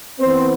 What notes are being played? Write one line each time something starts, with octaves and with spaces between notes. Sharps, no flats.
E3 B3 C4 C5